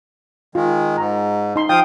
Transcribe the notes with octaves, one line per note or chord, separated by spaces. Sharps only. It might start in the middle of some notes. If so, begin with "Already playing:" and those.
D#3 G#3 F4
G#2 A#5
D#4 C6
F3 F5 G5 D#6